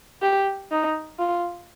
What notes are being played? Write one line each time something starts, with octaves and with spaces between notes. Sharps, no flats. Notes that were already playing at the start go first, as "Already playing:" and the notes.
G4
D#4
F4